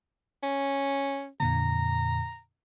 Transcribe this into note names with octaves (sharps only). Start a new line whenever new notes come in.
C#4
F2 A#2 D3 A#5